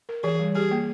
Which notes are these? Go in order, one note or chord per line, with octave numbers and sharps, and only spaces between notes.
A#4
E3 G#4
G3
G4 G#4
A#3